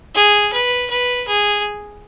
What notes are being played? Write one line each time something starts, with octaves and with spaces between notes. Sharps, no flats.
G#4
B4
B4
G#4